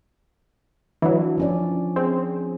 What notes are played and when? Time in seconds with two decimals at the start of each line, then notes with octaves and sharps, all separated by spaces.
1.02 E3 F#3 D4
1.38 F3 C#4 D5
1.96 C4 G#4